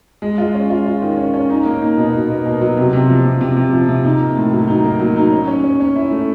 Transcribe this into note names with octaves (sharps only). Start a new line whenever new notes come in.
G#3
F4
C#4
F4
F4
D#3
C#4
C#4
D#4
A#3
D#4
B2
B2
A#3
B2
F#3
C3
C3
F3
C3
C3
C3
F3
C3
D#4
A#3
A2
F#3
D#4
A#3
F#3
D#4
C#4
C#4
C#4
C#4
E4
A3